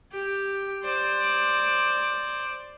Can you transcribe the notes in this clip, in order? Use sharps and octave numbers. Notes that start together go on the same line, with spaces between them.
G4
C5 D5